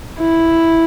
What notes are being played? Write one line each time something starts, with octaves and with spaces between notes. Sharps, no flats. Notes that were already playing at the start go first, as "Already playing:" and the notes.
E4